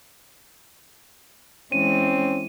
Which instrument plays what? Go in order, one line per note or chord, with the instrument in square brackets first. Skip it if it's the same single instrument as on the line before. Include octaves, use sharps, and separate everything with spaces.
[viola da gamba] E3 G#3 [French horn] C4 [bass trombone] C#4 [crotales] D#7